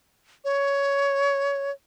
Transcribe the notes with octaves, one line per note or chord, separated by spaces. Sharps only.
C#5